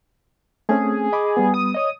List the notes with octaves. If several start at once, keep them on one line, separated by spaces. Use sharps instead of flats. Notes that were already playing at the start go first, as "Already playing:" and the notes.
A3 C4 C#4 G#4
D#5 B5 D6
G3 B3
D#6
C#5 D#5